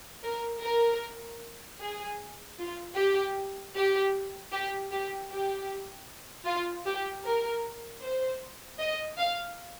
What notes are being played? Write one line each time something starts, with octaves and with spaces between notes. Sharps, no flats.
A#4
A#4
G#4
F4
G4
G4
G4
G4
G4
F4
G4
A#4
C5
D#5
F5